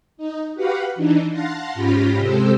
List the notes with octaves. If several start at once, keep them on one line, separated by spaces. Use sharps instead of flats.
D#4
F#4 G4 B4 F5 F#5 B5
E3 D4 D#4
F5 F#5 A5 C6 A#6
G#2 C#4 F4 G4 B5 A#6
C3 G#3 G4 A4 C5 E6